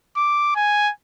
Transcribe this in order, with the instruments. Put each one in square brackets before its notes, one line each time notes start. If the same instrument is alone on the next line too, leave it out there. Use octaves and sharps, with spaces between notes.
[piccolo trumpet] D6
G#5